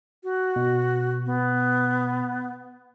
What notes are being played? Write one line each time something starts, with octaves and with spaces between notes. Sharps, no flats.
F#4
B2
B3